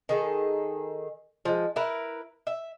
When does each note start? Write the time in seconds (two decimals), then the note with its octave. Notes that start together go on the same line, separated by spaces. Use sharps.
0.09 D#3 G#4 A4
1.45 F3 G#3
1.76 E4 A#4 B4
2.47 E5